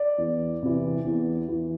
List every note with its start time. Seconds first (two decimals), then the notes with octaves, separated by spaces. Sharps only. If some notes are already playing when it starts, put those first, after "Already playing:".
Already playing: D5
0.18 E2
0.63 C3 E3
1.05 E2
1.49 E3